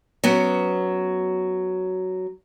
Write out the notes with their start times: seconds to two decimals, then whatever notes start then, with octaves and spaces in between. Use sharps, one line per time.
0.24 F#3 B3 C#4